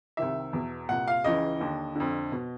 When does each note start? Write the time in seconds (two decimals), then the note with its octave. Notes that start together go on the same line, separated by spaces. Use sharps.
0.17 C2 C3 D#3 E5
0.53 E2 B2
0.89 C2 A#2 F#5
1.08 F5
1.24 C#2 C#3 E3 D#5
1.60 D#2 D3
1.95 F2 D3
2.32 B2